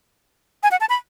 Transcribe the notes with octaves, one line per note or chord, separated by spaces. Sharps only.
G#5
F#5
A5
B5